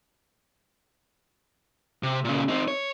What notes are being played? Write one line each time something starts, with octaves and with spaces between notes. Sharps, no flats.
C3
A#2 C#3
C4 D#4
C#5